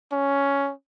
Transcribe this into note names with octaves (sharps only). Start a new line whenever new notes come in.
C#4